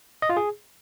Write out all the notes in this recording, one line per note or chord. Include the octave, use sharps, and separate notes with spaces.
D#5
F4
G#4